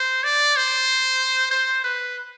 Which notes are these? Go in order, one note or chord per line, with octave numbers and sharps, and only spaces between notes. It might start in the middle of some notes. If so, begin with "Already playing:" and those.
Already playing: C5
D5
C5
C5
B4